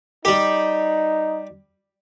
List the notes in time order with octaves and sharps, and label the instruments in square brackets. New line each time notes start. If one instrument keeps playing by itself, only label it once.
[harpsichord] G3 G4 [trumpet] D#4